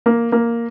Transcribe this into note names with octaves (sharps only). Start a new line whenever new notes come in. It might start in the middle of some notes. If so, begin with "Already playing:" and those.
A#3
A#3